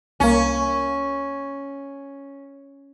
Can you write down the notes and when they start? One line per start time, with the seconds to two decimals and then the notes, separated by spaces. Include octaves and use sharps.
0.20 C2 A#3 C#4